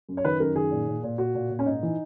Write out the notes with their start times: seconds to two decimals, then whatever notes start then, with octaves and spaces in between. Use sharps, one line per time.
0.09 F#2
0.17 C#5
0.25 D#3 B4
0.40 F#2 A#4
0.55 D#3 G#4
0.71 A#2
0.87 A#2
1.03 A#2
1.18 A#2 F#4
1.35 A#2
1.50 A#2
1.59 C#4
1.66 G#2 D#4
1.83 E3